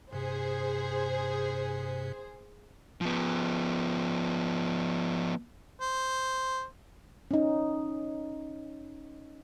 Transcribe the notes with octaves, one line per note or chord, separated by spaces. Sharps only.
G2 C3 G#4 C5
F3 B3
C5
C#4 D#4